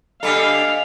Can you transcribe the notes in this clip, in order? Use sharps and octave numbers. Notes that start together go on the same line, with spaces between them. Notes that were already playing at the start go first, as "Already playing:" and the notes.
D3 G3 A4 D#5 F5 G#5 B6